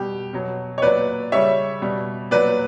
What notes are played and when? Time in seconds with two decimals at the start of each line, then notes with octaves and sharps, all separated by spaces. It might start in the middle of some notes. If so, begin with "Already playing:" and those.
Already playing: B2 G3 G4
0.33 B2 F#3
0.78 C#5
0.82 A#2 F#3 B4 D5
1.32 C#3 G3 C#5 E5
1.82 B2 G3
2.31 A#2 F#3 B4 D5